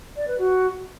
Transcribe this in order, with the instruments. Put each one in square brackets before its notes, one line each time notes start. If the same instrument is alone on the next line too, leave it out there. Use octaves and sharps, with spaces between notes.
[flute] D5
B4
F#4